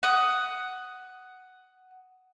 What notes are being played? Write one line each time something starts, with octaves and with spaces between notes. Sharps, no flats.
F#5 D#6